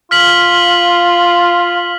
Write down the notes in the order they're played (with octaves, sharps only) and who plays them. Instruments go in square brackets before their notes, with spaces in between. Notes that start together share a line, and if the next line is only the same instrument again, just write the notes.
[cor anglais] F4 [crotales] F6 B6 F#7